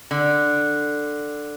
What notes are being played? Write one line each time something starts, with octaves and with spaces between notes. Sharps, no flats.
D3